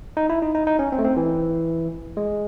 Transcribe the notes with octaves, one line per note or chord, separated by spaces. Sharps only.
D#4
E4
D#4
D#4
D#4
C#4
C4
A3
C4
E3
G#3